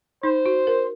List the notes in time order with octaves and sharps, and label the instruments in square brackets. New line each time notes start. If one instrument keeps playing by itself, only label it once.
[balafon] D#4 [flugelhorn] C5
[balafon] F#4
A#4